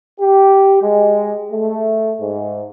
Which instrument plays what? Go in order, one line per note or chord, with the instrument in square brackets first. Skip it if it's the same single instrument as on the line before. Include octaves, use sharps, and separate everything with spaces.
[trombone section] G4
G#3
A3
G#2